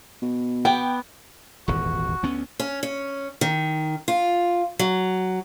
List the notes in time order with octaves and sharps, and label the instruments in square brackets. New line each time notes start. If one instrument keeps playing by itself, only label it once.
[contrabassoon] B2
[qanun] B3 D6 [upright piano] G5
[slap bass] D#1 G#1 E2 [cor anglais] F#4
[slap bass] D2 B3 C#4
[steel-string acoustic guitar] C#4
C#4
D#3
F4
F#3